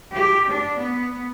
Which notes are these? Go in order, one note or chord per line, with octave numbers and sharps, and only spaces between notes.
G4
D4
B3